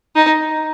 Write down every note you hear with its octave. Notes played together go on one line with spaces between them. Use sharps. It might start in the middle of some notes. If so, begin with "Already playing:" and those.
D#4